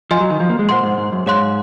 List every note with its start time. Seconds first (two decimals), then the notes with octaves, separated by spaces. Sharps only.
0.11 F3 D#5 G#5 C6
0.20 F#3
0.30 D#3
0.40 F3
0.49 A#3
0.59 G#3
0.68 A#2 C5 F#5 C6
0.83 G#2
0.98 G#2
1.12 F#2
1.26 G#2 G#4 C#5 F5 C6 F#6